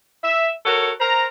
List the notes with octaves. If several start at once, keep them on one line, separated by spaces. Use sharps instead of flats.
E5
F#4 A4 A#4 C#5
A#4 C5 A#5